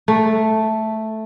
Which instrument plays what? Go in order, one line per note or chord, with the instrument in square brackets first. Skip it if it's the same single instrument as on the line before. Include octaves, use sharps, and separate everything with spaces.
[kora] A3